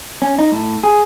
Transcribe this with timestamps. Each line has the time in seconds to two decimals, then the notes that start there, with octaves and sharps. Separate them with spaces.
0.22 C#4
0.39 D#4
0.52 A2
0.84 G#4